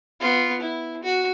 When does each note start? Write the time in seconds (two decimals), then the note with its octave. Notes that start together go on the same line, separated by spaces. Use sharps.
0.21 B3 F4
0.61 E4
1.03 F#4